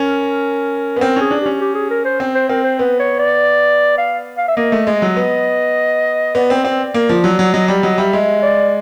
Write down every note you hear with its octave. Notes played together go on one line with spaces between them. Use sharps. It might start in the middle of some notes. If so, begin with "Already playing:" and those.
Already playing: C#4 A#4
B3
C4 A#4
C#4 G#4
D4
G4
C#4
G4
G#4
A#4
C5
C4
C5
C4 A#4
C5
B3 B4
C#5
D5
F5
F5
E5
A#3 D#5
A3
G#3 D#5
F#3
B3
B3 D5
C4
C4
A#3
F3
F#3
F#3
F#3 D#5
G3 D5
F#3 D#5
G3 E5
G#3 E5
D5